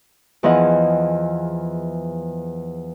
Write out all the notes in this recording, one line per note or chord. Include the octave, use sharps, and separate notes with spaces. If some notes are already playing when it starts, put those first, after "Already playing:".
E2 E3 F3 G#4 D#5 F#5